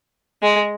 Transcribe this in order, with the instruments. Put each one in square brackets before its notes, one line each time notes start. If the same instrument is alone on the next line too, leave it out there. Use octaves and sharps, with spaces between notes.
[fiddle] G#3